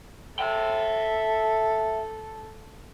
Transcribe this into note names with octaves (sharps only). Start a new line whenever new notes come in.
A4 E5 G5